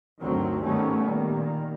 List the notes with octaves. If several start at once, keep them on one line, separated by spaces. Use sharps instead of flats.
D2 G2 D#3 F#3 C4
G#2 D#3 G3 A3 B3 C#4
A#2 D#3 G3